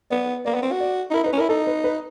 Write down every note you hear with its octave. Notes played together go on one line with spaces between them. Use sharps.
B3 D5
A#3 D5
B3
C4
F#4
D5
D#4
E4 A#4
D#4
B4
C#4
E4 A#4
D#4 A4
B4
B4